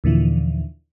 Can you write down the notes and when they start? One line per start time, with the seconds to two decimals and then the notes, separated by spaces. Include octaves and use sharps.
0.04 D#2 A#2 D3 E3 F3